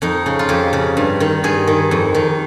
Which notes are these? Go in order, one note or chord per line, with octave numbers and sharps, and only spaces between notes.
F2 D#4
C#3
F4
F2 G4
C#3
G2
D#3
G2 G#4
D#3
F2
D#3